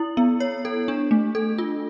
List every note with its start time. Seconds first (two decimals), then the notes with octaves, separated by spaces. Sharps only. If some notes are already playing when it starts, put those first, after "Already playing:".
Already playing: E4
0.17 B3
0.40 C#5
0.65 A4
0.88 D4
1.11 A3
1.35 A4
1.58 F4